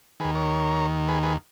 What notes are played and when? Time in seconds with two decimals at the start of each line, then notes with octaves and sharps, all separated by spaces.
0.20 D#2 D#3 G#4 B4
0.35 A#4 C#5
1.08 G#4 B4
1.23 G#4 B4